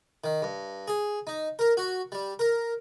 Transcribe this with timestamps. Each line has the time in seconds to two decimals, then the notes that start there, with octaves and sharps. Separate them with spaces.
0.24 D#3
0.42 G2
0.88 G#4
1.27 D#4
1.59 A#4
1.77 F#4
2.12 G3
2.39 A#4